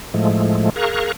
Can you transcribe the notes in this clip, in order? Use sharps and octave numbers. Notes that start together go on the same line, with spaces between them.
A2 F3 G#3 A3
G#4 A#4 F5 A#5 C#6 F#6